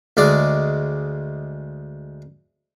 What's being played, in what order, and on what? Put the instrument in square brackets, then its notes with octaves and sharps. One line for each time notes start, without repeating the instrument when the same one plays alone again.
[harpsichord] D2 G#3 D5